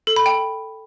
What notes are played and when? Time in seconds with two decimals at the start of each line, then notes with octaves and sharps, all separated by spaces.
0.07 A4
0.16 B5
0.26 G5